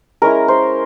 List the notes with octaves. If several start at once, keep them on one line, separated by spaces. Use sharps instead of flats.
G#3 C#4 E4 A#4
C5